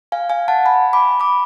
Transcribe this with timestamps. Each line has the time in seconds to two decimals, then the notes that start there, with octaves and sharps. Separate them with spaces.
0.12 F5 G#5
0.30 F5 G#5
0.48 F#5 A5
0.66 G#5 B5
0.93 B5 D6
1.20 B5 D6